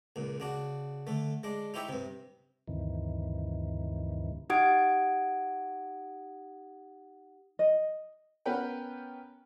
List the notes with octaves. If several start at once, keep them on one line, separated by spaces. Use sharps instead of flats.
C#2 A#2
C#3 D4 F#4
D3 A3
G#3 D4
D#4 E4 G4 C#5 E5
G2 C3
D2 G2 C3 D#3 E3
D#4 G4 F#5 D#6 G#6 D7
D#5
B3 C#4 A#4 B4 F#5 G5